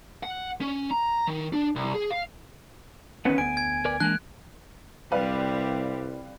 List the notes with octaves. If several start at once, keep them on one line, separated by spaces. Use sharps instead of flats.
F#5
C#4
A#5
D#3
D4
C2
G#4
F5
D#3 B3 C#4 B4 F#5
D2 B3 G#5 D7
G#6
A#4 B4 D5
E3 G#3 A#3 D4 F#6
C2 G3 C4 G4 B4 D5 F5